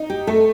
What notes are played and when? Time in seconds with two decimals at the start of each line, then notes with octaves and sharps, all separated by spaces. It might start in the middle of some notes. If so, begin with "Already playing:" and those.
Already playing: D#4
0.10 G4
0.27 A3 A4